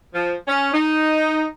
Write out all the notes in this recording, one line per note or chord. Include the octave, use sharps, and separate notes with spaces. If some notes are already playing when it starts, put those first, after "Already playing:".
F3
C#4
D#4